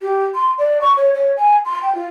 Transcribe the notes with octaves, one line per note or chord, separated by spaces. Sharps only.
G4
C6
D5
C#6
C#5
C#5
G#5
C6
G5
F4